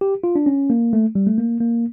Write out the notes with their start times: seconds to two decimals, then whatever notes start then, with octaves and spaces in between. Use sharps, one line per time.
0.01 G4
0.24 F4
0.36 D4
0.46 C#4
0.70 A#3
0.93 A3
1.15 G3
1.27 A3
1.38 A#3
1.61 A#3